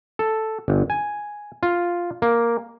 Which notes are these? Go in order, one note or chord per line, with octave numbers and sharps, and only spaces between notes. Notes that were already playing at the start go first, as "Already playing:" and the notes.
A4
G1
G#5
F4
A#3